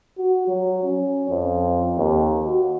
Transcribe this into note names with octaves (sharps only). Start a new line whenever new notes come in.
F#4
F#3
C#4
F2
D#2
F#4